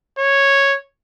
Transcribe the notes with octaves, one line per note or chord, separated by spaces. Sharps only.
C#5